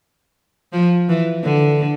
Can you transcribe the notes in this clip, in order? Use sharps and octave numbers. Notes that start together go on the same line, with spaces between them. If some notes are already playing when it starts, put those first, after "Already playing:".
F3
E3
D3